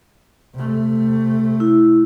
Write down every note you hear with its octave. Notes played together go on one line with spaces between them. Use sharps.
C3 A3
E4